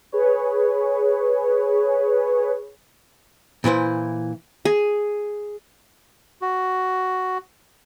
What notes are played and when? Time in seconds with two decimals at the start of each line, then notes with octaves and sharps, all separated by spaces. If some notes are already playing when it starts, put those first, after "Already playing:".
0.12 G#4 B4 C#5
3.64 A#2 E3 E4 C5
4.65 G#4
6.42 F#4